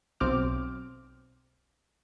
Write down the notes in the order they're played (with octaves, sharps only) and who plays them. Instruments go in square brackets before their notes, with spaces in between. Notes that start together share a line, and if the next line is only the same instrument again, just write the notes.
[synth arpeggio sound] B1 C4 D6 F6